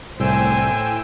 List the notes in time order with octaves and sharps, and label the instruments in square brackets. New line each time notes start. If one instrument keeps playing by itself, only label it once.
[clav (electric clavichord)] C2 [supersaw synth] A2 G5 E6 [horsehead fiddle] C5 G#5